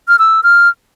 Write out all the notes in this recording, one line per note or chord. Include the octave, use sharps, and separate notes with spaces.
F6
E6
F6